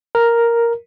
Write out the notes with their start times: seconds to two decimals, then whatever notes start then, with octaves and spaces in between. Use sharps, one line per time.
0.15 A#4